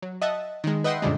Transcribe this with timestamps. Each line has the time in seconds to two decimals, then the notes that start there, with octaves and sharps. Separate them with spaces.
0.03 F#3
0.22 D#5 E5 F#5 A5
0.64 D#3 G#3
0.84 B4 D#5 E5 F#5 G5 C6
1.02 F#2 A#2 D3 G3 G#3